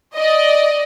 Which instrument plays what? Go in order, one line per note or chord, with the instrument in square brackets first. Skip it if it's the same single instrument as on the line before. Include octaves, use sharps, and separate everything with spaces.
[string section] D5 D#5